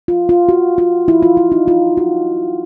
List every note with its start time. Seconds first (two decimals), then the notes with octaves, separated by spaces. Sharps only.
0.08 F4
0.29 F4
0.49 F#4
0.78 F4
1.08 E4
1.23 F4
1.37 E4
1.52 D#4
1.68 F4
1.97 F#4